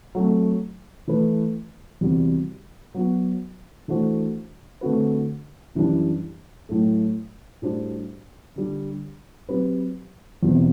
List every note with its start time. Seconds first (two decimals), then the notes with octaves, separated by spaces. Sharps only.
0.15 F#3 A3 C4
1.08 E3 A3 E4 B4
2.01 E2 C3 G3 C4 F#4
2.94 F#3 B3 F#4
3.88 E3 A3 D4 F#4 C5
4.81 D3 A3 C4 F#4 B4
5.75 F#2 E3 G3 D4 G4
6.69 A2 F#3 A3
7.62 A2 G3 D4 F#4 C5
8.56 D3 G3 D4
9.49 F#3 C4 G4 B4
10.42 E2 B2 G3 C4